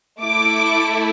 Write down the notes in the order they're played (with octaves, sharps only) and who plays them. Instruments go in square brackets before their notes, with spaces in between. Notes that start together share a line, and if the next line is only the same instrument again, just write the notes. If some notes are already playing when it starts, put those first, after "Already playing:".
[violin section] A3 E4 A4 D6